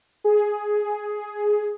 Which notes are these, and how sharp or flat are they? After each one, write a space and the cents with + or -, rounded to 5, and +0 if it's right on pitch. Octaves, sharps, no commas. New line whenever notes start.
G#4 +10